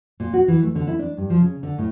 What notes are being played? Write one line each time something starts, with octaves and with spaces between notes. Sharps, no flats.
A#2
F#4
E3
A3
D3
E4
D4
G2
F3
C#3
D3
A2